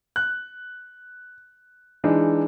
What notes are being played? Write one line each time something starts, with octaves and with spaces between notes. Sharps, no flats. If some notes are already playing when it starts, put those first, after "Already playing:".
F#6
E3 G#3 D4 D#4